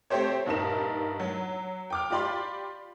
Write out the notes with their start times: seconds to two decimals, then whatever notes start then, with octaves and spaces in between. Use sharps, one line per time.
0.10 A3 C4 G4 C5 C#5
0.46 A#1 G2 D4 D#4 A#4 E7
1.20 F#3
1.90 G5 D6 F6
2.10 F4 G4 D5 B5 C6